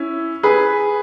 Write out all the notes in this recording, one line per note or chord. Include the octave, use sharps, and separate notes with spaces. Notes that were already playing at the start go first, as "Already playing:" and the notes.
Already playing: C#4 E4
G#4 B4